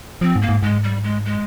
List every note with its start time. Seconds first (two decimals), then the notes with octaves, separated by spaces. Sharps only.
0.21 F3 C4
0.36 G#2
0.42 A#3
0.49 G#2
0.63 G#2 G#3
0.84 G3
1.04 G#3
1.26 G#3